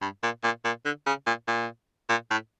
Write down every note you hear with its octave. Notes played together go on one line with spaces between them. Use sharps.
G2
A#2
A#2
A#2
D3
C#3
A#2
A#2
A#2
A2